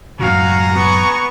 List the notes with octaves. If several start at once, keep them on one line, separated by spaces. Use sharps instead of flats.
F#2 A2 C#3 F#4 F5 F#5 G#5 A#5
B3 C#6